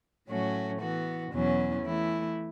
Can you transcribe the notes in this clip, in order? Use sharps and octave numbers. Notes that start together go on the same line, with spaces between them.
A2 F#3 A3 C#4 F#4
E3 B3 F#4
E2 B2 F#3 C#4
E3 A3 E4